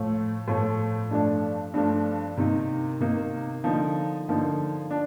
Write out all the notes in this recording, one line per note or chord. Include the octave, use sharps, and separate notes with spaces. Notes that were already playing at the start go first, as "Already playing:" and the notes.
Already playing: A2 F3 A3
A2 F3 A3
G2 F3 A3 D4
G2 F3 A3 D4
C3 D#3 A#3 D#4
C3 D#3 A#3 D#4
D3 F3 A#3 D#4
D3 F3 A#3 D#4
D4